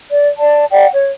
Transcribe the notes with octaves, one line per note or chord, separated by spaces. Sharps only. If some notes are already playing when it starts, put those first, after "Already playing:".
D5
D5 A5
D5 F#5 G5
C#5